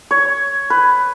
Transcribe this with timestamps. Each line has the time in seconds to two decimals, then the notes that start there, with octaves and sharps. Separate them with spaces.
0.11 C#5
0.70 B4